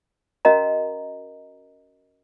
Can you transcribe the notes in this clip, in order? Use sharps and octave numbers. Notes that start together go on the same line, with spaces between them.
C#4 F#4 A#4 D#5 F5 A#5